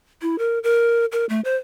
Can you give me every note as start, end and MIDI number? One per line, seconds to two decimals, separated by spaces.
0.22 0.38 64
0.38 0.59 70
0.63 1.05 70
1.12 1.25 70
1.29 1.40 57
1.44 1.56 72